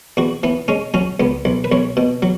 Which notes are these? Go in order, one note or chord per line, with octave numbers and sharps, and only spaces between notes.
E2 F#4
E3 B3
G#3 C#4
F#3 C#4
C#2 B3
B1
B4
B1 C#5
B2
F#3